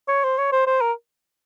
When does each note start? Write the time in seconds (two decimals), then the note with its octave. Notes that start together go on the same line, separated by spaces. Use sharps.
0.08 C#5
0.24 C5
0.38 C#5
0.53 C5
0.67 C5
0.81 A#4